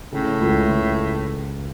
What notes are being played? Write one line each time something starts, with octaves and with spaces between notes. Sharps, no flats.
A2 C#3
C#2
C#2